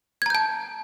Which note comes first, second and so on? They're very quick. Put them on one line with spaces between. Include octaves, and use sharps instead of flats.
G#6 A#5 G6 A5